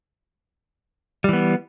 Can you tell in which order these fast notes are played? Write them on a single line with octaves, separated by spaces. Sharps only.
G3 E3 B3